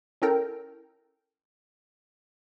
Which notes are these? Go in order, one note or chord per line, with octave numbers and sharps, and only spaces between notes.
C#4 E4 A4 A#4 G5